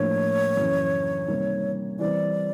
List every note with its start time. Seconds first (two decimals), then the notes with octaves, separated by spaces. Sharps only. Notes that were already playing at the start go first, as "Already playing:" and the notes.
Already playing: A2 F3 A#3 D4 C#5
0.57 F#2 C#3 E3
1.28 C3 D#3 G3 A#3
1.99 E3 G3 C4 D5